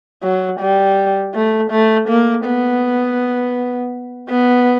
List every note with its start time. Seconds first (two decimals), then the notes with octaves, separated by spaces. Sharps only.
0.23 F#3
0.60 G3
1.35 A3
1.71 A3
2.09 A#3
2.45 B3
4.29 B3